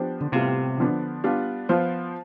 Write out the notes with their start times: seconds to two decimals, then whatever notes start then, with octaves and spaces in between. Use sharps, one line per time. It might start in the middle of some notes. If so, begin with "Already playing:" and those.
Already playing: F3 B3 D4 G4 C5
0.21 D3
0.32 A2 C3 G3 B3 F4
0.78 D3 F3 B3 D4
1.24 G3 B3 D4 F4
1.69 F3 B3 F4 C5